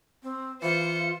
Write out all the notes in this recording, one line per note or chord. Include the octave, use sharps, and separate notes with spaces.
C4
E3 F4 C5 C#7